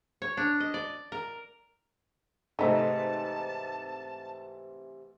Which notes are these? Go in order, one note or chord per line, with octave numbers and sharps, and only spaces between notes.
C#5
D4
D#5
D5
A#4
G#2 C3 E3 A3 D#4 A4 A5 A#5